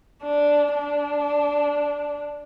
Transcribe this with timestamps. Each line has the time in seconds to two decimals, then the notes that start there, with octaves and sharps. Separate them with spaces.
0.23 D4
0.76 D4